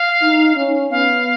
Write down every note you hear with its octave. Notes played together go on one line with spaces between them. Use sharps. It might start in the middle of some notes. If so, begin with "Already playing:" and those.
Already playing: F5
D#4
C#4
B3 F5